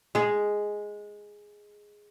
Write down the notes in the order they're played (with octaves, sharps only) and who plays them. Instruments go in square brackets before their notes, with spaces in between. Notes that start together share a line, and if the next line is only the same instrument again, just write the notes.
[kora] G#3 G#4